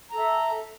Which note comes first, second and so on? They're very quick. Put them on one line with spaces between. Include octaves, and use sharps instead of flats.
A#5 A4 E5